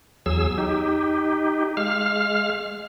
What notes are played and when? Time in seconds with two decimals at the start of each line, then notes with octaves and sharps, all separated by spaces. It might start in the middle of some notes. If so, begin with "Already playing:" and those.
0.26 E2 F#3 G#4 E6
0.58 D#4 G4
1.77 G#3 F5 F6